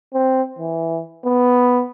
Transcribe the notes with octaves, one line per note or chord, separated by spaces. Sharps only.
C4
E3
B3